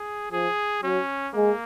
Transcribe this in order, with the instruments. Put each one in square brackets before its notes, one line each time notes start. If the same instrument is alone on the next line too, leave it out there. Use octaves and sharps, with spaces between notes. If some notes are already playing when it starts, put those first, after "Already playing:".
Already playing: [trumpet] G#4
[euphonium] F3 [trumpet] G#4
[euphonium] F#3 [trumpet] C#4
[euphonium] G#3 [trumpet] A#3